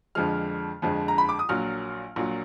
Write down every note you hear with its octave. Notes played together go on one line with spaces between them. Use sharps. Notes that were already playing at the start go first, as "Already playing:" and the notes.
F2 D3 F3 G#3 F6
F2 D3 F3 G#3
A#5
B5
D6
D#6
A#1 A#2 F#3 F6
A#1 A#2 F#3